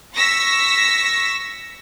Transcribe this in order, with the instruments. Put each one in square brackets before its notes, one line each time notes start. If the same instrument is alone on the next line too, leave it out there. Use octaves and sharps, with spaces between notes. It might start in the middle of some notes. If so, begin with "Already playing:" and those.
[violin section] C#6 E6 A#6 B6